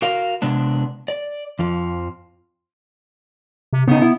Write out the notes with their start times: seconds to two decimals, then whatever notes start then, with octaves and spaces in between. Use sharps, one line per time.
0.02 F#4 A#4 F5
0.42 C3 G#3 B3 D4
1.08 D5
1.59 F2 F3
3.73 C3
3.88 C#3 B3 D#4
4.02 E4